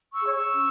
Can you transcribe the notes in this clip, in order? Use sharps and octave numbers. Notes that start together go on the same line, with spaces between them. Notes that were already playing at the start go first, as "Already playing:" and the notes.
C#6 E6
G#4 C#5
C#6 E6
C#4